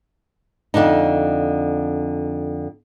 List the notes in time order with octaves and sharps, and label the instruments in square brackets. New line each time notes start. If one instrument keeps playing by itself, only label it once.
[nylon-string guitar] F2 D3 D4 D#4